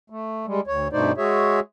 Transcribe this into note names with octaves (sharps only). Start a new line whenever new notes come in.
A3
G3 G#3
D2 C#5
G2 B2 A3 D#4 C5 D5
G#3 F#4 G#4 C#5 E5